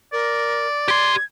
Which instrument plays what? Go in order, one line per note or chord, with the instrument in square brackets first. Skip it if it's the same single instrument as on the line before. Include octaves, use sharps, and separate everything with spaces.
[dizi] A#4 [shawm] D5
[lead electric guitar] G4 C6 [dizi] G#6